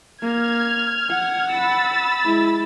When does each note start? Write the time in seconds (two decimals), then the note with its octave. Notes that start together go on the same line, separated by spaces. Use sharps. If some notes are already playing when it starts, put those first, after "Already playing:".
0.22 A#3 F6 G#6
1.10 F#5
1.51 B5 E6 A6
2.24 G#3 E4